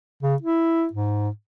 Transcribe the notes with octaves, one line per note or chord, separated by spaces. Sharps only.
C#3
E4
G#2